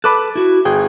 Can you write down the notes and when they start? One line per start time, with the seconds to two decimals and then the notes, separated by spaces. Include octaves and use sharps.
0.04 A4 B4 B5 D6 F#6
0.35 E4 F#4
0.65 G1 G#4 G5